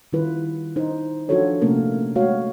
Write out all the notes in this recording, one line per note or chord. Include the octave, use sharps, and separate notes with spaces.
D#3 G3 E4 F4 B4
D#4 C5
F3 D4 F4 F#4 A4 C#5
C3 A3 A#3 C#4 A#4
G#3 A3 F#4 C#5 F5